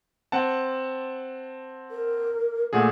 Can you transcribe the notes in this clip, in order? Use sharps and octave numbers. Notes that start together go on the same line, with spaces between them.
C4 F#5 A5
A#4
A#2 A3 G#4 F#5